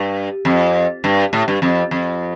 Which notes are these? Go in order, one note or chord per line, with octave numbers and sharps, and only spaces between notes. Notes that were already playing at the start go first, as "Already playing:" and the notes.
Already playing: G2
F2
G2
A2
G2
F2
F2